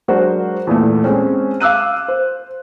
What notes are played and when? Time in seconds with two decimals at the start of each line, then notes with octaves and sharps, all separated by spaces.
0.08 F#3 G#3 D4 F#4 A#4 C5
0.67 E2 A#2 A3
1.04 G#3 C4 C#4
1.60 F5 D6 E6 F#6 D#7
2.08 C5